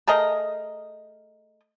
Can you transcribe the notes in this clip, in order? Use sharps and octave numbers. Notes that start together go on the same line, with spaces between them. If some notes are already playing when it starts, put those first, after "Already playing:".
A3 G#4 A#4 D#5